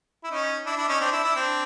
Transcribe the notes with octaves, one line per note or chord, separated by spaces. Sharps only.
E4
C#4 D#4
D4 E4
D4 E4
C#4 D#4
C4 D4
D4 E4
D4 E4
C4 D4